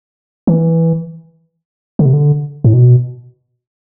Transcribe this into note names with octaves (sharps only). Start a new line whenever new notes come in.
E3
D3
C3
D3
A2
B2